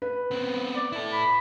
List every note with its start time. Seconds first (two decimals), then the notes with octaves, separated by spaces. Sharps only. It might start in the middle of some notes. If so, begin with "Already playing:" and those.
0.02 B4
0.31 B3 C4
0.75 D5
0.92 E4 A4
1.12 B5